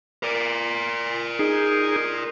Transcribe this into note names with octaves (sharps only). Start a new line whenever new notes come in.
A#4 D5
D#4 G#4